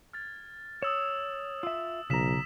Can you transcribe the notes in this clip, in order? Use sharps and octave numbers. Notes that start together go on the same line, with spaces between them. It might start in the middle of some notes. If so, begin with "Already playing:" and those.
F6 G#6 A6
C#5 D#6 E6 E7
F4 E5 E6
B1 C#3 A#5 B6 E7